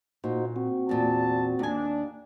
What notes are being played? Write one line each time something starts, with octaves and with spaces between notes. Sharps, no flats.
A#2 D#4 F#4 C5
C4 F#4
E2 A#2 A5
D#2 D4 G#5